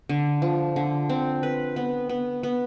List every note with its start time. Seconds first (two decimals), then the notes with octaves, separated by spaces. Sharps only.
0.09 D3
0.42 F3
0.76 D3
1.09 C4
1.43 B4
1.76 B3
2.09 B3
2.43 B3